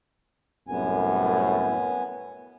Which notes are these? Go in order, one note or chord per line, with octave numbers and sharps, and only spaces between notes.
C2 F#2 A2 B3 G#5